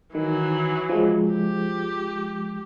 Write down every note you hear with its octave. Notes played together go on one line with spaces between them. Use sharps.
D#3 E3 F#3
F3 G#3
G4